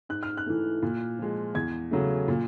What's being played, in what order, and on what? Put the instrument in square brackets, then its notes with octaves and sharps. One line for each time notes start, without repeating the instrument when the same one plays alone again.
[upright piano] G#2 F#6
F6
F#6
E3 A3
A#2
F3 G#3
E2 G#6
C#3 F#3 A3
A#2